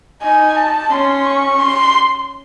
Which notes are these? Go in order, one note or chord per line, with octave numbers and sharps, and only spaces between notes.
D#4 G#5
A5
C#4 C6
C#6
C6